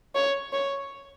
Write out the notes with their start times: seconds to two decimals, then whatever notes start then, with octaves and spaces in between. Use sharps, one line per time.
0.15 C#5
0.53 C#5